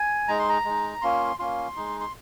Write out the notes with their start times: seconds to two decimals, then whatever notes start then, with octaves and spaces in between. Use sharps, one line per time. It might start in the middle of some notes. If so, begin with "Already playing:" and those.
Already playing: G#5
0.28 G#3 D#4 A#5
0.39 C6
0.49 A#5
0.65 G#3
0.70 D#4
1.02 A#3 C#4 F4 C6
1.39 A#3 C#4 F4 C6
1.76 G#3 D#4
2.01 C6